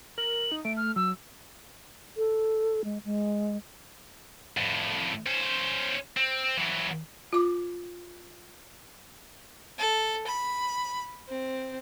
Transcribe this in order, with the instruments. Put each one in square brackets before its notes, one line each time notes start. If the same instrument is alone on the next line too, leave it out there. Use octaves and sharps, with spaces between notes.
[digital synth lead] A#4 [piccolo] F#7
[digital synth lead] D#4
[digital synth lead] A3 [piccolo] D7
[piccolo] F6
[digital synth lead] F#3 [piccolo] E6
[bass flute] A4
G#3
G#3
[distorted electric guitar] F2 A2
C#4 C5
C4
E3 F#3
[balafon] F4 D6
[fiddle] A4
B5
C4